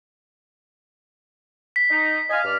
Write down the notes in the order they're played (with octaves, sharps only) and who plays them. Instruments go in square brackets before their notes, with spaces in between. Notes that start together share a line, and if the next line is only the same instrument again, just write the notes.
[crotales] B6
[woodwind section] D#4
D#5 F5 G#5
G2 D5 F6